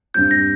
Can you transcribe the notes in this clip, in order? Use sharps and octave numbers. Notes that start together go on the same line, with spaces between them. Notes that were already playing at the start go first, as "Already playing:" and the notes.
G2 G3 C4 G6
A#6